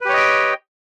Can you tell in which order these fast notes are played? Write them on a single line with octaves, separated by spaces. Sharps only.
B4 G4 C#5 D#5 G5